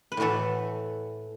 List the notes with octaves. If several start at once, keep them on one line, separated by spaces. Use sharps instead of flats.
B4
A2 E3 A3 F#4 A4